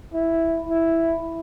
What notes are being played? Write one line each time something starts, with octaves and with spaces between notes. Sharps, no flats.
E4
E4